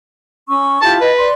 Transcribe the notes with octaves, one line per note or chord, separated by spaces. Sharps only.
C#4 C#6 E6
E4 F4 G4 A5
B4 D#5
D5 C6